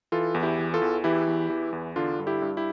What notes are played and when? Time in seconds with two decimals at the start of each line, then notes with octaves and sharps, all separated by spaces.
0.12 E3 F4 A4
0.34 E2
0.43 E4 G4
0.59 E3
0.73 F4 A4
0.82 E2
1.04 E3 E4 G4
1.27 E2
1.50 E3
1.73 E2
1.96 D3 D4 F4
2.19 G2
2.27 E4 G4
2.42 G2
2.57 E4 G4